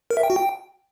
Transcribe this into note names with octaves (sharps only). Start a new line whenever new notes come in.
A#4
E5
G5
F#4
G5